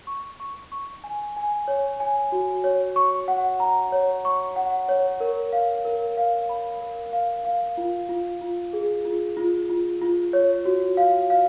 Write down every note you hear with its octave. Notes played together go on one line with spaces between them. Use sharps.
C#6
C#6
C#6
G#5
G#5
C#5
G#5
F#4
C#5
C#6
F#5
A#5
C#5
C#6
F#5
C#5
A#4
F5
A#4
F5
B5
A#4
F5
F5
F4
F4
F4
G#4
F4
F4
F4
F4
C#5
F#4
F5
F5